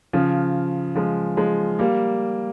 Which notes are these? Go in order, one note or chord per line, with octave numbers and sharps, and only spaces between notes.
C#3 F3
F3 G#3
F3 G#3
G3 A#3